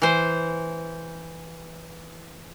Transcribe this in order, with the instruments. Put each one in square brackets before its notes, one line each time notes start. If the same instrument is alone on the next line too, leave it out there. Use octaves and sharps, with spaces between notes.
[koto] E3 C5